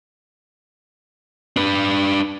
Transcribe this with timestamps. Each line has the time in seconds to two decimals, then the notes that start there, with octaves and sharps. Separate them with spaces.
1.57 D4 B4